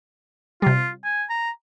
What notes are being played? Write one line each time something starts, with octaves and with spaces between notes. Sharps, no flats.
C3 G3 F4
G#5
A#5